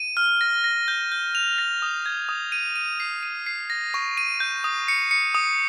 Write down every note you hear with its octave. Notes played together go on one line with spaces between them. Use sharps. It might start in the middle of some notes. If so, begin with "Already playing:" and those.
Already playing: D#7
F6
A#6
A#6
G6
G6
F7
A#6
D#6
G#6
D#6
D#7
D#7
C7
D#7
C7
A#6
C#6
D#7
G6
D#6
C#7
C#7
D#6